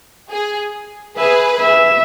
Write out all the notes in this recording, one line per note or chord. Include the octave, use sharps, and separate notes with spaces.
G#4
G#4 B4 E5
E5